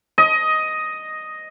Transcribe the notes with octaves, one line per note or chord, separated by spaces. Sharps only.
D#5